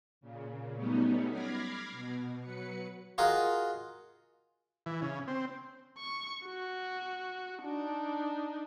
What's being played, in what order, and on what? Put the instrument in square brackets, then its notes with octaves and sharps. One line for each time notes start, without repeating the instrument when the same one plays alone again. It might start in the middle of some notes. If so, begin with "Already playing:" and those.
[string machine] A#2 C#3
F#3 G3 A3 B3 C#4 D#4
B5 D6 F6 G#6 A#6 C7
B2
F#3 B4 C#7
[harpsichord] F4 F#4 G#4 A#4 D#5
[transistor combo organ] E3
C#3
C4
[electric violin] C#6
F#4
D4 D#4